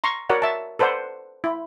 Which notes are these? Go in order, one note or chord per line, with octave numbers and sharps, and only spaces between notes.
A#5 C6 C#6
F#4 A#4 C#5 D5 F#5
E5 A5
A4 B4 C5 D5 F#5
E4